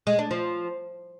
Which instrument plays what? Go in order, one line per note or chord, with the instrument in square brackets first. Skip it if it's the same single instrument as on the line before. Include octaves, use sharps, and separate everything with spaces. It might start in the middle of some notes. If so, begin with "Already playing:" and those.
[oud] G#3
D4
F3